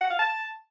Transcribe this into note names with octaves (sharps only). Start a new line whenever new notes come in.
F#5
F5
A5